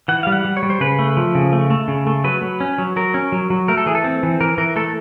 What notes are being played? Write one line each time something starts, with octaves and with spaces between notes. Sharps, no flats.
E3 F#5
G3 F5
F#5
G3
C#5
G3
C5
C#3 B4
A3
F3
C#3
A3
A3
C#3
A3
F#3 B4
F#3
C#4
F#3
F#3 A#4
C#4
F#3
F#3
A3 A#4
A4
E3 G#4
A4
C4
E3
E3 A#4
E3 A#4
A3 A4